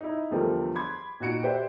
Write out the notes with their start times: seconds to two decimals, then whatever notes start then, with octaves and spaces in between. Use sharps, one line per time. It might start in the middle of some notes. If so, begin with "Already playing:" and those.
0.01 D#4 E4
0.31 E2 D3 F3 G3 A3 A#4
0.75 B5 C6 D6 G#6
1.20 A#2 D#4 F#4 C#7 D7
1.43 G4 B4 C5 D5 E5 G5